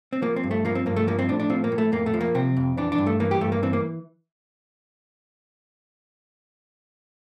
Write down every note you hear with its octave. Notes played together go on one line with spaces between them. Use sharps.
C4
F3 A#3
C4
G2
A3
F3 A#3
C4
G2 A#3
A3
F3 A#3
C4
A2 D4
D4
F3 C4
A#3
A2
A3
F2 A#3
A3
F3
A#3
C3 C4
F2
E3 D4
D4
G2
A3
E3 A#3
G4
G2 A3
A#3
E3 C4
A#3